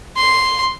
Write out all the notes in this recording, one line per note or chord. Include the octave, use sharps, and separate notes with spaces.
C6